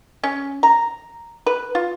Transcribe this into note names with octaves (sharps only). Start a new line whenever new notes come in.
C#4
A#5
B4
F4